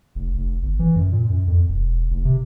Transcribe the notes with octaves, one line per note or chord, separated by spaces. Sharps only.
F1
F1
G1
E3
F#2
A#2
F#2
F2
E1
F1
C3